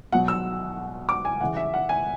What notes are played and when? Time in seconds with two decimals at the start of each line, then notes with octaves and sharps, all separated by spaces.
0.12 B2 F#3 F#5
0.28 E6
1.09 D6
1.25 G#5
1.41 C#3 E3 F#5
1.57 E5
1.74 F#5
1.89 G#5